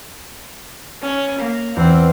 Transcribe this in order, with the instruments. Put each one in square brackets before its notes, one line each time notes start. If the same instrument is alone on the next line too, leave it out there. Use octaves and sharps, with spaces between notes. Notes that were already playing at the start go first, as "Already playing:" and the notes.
[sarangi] C#4
[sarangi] A#3 [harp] B6
[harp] E2 [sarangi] C4